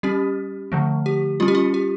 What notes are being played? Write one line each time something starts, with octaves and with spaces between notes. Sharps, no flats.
G3 C#4 G4
D3 F3 A3
G4
G3 C#4 F4
G4
F4
G4